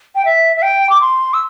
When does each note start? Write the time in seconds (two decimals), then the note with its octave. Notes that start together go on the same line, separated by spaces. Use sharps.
0.15 G5
0.25 E5
0.57 E5
0.62 G5
0.90 D6
1.01 C6
1.34 E6